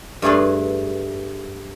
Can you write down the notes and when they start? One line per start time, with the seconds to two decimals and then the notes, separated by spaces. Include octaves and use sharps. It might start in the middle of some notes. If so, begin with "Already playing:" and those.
0.22 G2 A3 G#4 B4 C6